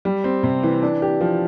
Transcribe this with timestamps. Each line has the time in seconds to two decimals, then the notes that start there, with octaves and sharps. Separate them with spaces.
0.05 G3
0.24 C4
0.43 C3
0.63 E3
0.83 D4
1.02 G4
1.21 F3